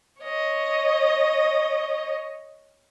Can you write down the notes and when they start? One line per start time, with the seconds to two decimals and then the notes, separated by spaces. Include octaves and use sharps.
0.22 C#5 D#5